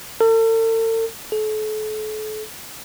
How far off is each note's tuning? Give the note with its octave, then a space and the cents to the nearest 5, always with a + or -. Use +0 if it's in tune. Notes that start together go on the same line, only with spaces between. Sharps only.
A4 +45
A4 -35